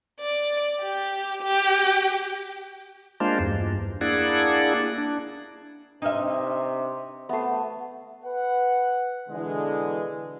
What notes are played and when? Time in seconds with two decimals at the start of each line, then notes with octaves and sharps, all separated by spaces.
0.20 D5
0.81 G4
1.43 G4
3.20 G#3 A#3 D4 F4 C5
3.39 E2 G2
4.01 A#3 D4 E4 G#4 D5 F#5
4.98 D4
6.02 C3 D4 D#4 B4 E5
7.29 A3 B3 E5 F#5
8.24 B4 F#5
9.29 B2 D3 E3 G#3